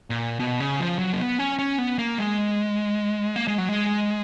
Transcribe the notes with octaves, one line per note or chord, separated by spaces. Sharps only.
A#2
B2
C#3
F3
F#3
A#3
B3
C#4
C#4
B3
A#3
G#3
A#3
G#3
F#3
G#3